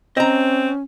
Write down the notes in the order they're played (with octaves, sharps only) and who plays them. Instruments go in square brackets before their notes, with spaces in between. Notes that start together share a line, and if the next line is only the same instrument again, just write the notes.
[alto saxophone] C4 [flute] C#4 [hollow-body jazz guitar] D#5 A#5